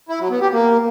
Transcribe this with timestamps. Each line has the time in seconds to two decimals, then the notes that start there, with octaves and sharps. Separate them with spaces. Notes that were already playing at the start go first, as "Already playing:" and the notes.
0.09 E4
0.20 F#3
0.31 B3
0.41 G4
0.52 A#3